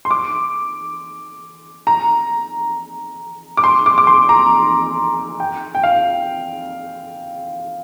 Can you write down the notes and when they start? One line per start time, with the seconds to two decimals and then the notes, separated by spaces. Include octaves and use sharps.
0.05 C6
0.11 D6
1.87 A#5
3.57 D6
3.64 C6
3.86 D6
3.98 D6
4.07 C6
4.29 A#5
5.40 G5
5.75 G5
5.83 F5